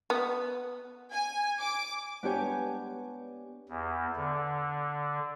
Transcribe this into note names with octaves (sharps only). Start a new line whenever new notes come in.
B3
G#5
D6
B3 D4 G4 C#5 G#5
E2
D3